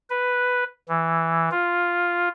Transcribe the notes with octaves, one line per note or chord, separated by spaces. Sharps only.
B4
E3
F4